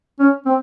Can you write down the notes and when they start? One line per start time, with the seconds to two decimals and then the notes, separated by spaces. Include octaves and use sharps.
0.19 C#4
0.46 C4